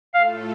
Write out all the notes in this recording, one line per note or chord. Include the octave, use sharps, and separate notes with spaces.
A2 A3 F4 A4 F5